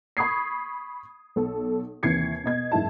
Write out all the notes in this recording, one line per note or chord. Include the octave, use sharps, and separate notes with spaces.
B5 C#6 D#6 G#6 C7
B1 A4
D#2 C3 E3 G#6 C7 C#7
B2 D#5 G#6
F#1 G#2 E4 A5